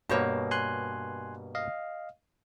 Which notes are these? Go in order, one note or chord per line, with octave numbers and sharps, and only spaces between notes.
G2 B2 A#3 F#4 C5 C#5
G#5 C6 F#6
D#5 F5